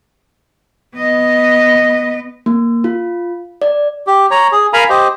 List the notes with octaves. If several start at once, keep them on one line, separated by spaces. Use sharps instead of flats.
B3 D#5
A#3
F4
D5
G4
C#5 A#5
G#4
A#4 F5 G#5 A#5 B5
G4 C5 D#5